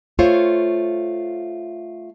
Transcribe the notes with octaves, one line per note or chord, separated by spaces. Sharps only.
A3 F4 C5 C#5 F5